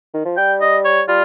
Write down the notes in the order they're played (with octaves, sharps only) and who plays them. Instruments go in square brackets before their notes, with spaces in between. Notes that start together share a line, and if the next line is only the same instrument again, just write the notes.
[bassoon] D#3
F3
[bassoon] G3 [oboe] G5
[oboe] D#5
C#5
[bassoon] G3 [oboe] F4